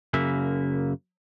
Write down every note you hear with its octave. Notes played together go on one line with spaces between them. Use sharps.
F#2 C#3 A#3 E5